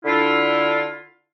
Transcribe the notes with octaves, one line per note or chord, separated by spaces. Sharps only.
D3 E4 F4